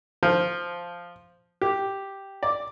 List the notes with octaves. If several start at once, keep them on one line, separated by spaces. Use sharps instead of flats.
F3
G4
D5